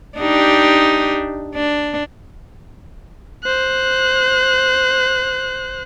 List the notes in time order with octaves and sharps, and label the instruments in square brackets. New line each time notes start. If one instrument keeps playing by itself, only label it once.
[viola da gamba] D4 D#4 G4
D4
[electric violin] C5 F#6